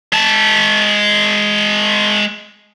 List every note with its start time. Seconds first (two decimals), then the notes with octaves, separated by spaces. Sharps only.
0.12 G#3 A5